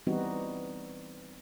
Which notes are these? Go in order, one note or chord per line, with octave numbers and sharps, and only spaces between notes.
E3 G3 B3 C4 D#4 F#4